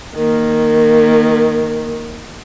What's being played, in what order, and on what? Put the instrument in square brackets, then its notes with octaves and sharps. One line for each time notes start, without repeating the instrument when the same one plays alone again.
[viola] D#3 A#3